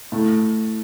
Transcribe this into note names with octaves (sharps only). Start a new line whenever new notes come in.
A2